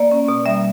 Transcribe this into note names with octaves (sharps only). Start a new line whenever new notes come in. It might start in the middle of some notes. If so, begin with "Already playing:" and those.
Already playing: A#3 D5
C#4
B2
G3 E5